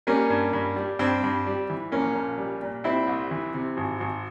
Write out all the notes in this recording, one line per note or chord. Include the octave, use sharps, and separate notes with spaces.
G3 A#3 C#4
G2
G2
G3
G2 C4
G2
G3
E3
A#1 A#3 C#4
A#1
G3
A#2
G3 C4 E4
C2
E3
C3
G#1
G#1